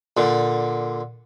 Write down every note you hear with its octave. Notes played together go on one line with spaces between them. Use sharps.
A#2 D3